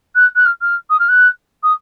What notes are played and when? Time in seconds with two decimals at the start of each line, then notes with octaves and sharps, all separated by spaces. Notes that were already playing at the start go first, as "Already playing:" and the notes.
0.15 F#6
0.36 F#6
0.46 F6
0.61 F6
0.90 D#6
0.99 F6
1.09 F#6
1.63 D#6